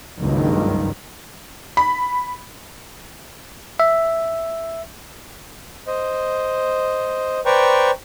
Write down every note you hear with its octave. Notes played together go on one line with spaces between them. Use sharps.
F#1 C#2 G2 D#3
B5
E5
C5 D#5
B4 C5 D5 G5 A#5 C#6